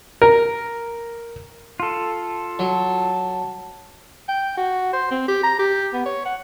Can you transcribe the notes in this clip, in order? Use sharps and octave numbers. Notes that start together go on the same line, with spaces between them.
A#4
F4 A4
F#3 A5
G5
F#4
C5
C4
G4
A#5
G4
B3
C#5
F#5